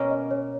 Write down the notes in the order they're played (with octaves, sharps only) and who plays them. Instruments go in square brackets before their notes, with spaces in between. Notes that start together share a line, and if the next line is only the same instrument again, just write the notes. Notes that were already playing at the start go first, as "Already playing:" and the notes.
Already playing: [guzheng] B2 A#3 C#4 [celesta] C#5
[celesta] D#5
C#5